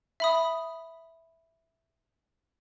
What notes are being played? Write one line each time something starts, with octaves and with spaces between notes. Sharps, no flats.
E5 B5 D#6